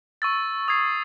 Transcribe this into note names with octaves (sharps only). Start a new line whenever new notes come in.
C#6 E6 A6
D#6 G#6 C7